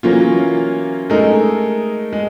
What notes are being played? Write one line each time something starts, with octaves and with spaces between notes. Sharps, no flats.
E3 F#3 A#3 C#4 F4
G#3 A3 D#4 A4 A#4
G#3